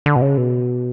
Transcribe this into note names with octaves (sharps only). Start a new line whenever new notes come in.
D3
B2
C#3
B2